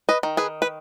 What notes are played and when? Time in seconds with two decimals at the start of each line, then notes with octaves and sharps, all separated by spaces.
0.09 B4 D#5
0.23 D#3
0.37 G#4 B4
0.62 B4